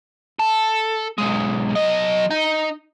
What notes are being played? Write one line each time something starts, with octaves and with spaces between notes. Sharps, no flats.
A4
B1 G#3
F#3 D#5
D#4